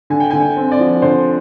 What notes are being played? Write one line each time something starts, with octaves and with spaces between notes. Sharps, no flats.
D3 G#5
G5
D3 G#5
G5
C4
D5
F3
D3 C5